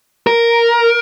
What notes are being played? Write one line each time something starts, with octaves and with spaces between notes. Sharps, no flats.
A#4